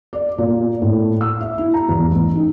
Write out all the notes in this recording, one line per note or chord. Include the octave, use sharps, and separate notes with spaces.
D5
A#2
A2
E6
E5
E4
A#5
E2
A1
D#4